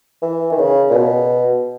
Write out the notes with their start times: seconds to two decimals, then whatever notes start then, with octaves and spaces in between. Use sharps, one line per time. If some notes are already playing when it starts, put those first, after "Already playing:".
0.22 E3
0.52 D#3
0.58 C#3
0.90 A#2
0.95 B2